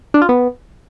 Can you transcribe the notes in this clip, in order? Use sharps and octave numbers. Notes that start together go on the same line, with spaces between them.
D4
F4
B3